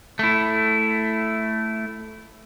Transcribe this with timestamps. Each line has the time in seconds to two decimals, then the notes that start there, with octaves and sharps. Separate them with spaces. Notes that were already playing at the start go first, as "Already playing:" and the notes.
0.19 A3 E4